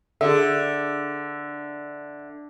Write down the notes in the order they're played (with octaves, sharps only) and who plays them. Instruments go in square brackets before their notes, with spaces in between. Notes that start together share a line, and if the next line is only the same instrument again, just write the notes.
[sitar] D3 [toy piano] G#4 A4 [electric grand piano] E5